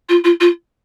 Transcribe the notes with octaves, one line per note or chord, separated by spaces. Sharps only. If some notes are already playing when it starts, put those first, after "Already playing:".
F4
F4
F4